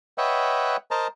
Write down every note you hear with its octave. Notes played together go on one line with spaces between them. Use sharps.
B4 C#5 D#5 E5 F#5 G5
A#4 C5 D#5 A5 A#5